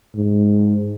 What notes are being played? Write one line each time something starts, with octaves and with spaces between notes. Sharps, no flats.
G#2